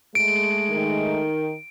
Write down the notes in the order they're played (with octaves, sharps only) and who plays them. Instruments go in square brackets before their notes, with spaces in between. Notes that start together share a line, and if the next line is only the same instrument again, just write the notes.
[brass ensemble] G#3 A3 [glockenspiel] D7
[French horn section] D#3